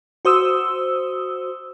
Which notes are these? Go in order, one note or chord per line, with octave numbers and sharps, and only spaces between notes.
F#4 C5 D#6 E6